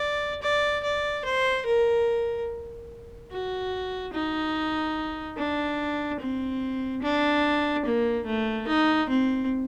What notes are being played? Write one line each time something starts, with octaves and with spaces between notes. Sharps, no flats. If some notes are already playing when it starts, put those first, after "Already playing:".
Already playing: D5
D5
D5
C5
A#4
F#4
D#4
D4
C4
D4
A#3
A3
D#4
C4